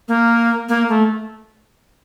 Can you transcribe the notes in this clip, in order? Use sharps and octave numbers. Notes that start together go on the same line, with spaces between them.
A#3
A#3
A3